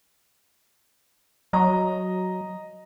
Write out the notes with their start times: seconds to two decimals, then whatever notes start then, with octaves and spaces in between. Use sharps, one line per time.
1.53 F#3 D#5 A#5